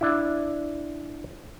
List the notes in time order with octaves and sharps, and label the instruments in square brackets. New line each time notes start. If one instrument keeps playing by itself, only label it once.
[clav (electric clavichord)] D4 E4